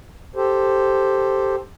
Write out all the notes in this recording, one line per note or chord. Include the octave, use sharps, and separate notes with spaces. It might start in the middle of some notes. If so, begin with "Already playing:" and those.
G4 A4 C5